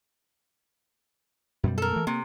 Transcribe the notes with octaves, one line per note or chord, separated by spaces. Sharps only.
F#2 B2 G3
A4 A#4
E3 A3
C3 A#3